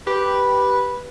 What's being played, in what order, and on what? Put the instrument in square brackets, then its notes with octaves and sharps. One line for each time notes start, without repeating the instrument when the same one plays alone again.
[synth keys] G4 [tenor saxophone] B4